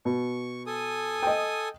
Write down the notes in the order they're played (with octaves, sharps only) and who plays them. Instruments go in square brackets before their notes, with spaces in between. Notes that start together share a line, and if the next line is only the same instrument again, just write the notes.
[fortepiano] B2 [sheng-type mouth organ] C#6
[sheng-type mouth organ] A4 G#5 D#6
[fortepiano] D#5 G5